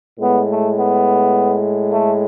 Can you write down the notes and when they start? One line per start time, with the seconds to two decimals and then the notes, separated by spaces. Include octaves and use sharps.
0.20 A2 G#3 B3
0.49 A3
0.77 B3
1.90 A3